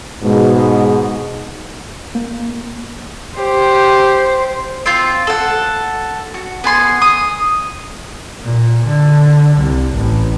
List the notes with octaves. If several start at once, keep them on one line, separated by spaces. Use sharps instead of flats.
G#2 B2 G#3
A#3
G4 C5
C4 F4
A4 F#5
F#4
B3 G#5 C6
D#6
A#2
D3
C2
A1